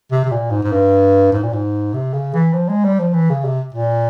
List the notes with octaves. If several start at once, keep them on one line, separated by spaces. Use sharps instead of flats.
C3
C3
A#2
G#2
G#2
G2
G#2
A#2
G#2
C3
C#3
E3
F3
G#3
G3
F3
E3
C#3
C3
A#2